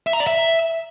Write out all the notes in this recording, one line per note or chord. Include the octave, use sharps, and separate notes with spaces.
E5
A#5
D5
E5